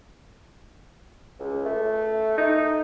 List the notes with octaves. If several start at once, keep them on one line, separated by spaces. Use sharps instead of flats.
C#2
A3
D#4